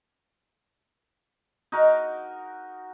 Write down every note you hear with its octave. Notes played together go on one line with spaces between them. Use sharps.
D#4 F#4 A#4